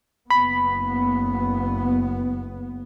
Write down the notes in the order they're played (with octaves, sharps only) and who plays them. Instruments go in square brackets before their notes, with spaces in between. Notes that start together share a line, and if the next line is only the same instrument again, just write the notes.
[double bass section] F#1 B3 [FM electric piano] B5